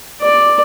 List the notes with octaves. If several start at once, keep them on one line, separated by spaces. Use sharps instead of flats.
D5